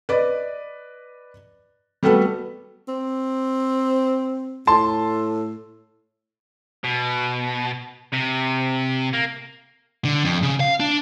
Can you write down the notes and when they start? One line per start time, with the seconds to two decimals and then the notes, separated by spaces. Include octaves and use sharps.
0.09 B4 D5 D#5
2.03 G3 A3 B3 F#4 A4 B4
2.88 C4
4.67 A2 A5 C6
6.84 B2
8.13 C3
9.13 A#3
10.05 D3
10.25 F2
10.43 C#3
10.60 F5
10.80 D4